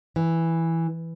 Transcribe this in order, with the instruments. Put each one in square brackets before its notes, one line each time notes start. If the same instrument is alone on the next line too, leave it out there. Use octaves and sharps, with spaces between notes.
[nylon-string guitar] E3